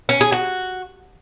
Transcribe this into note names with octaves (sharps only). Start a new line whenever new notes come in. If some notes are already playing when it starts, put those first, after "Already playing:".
C#4
G#4
F#4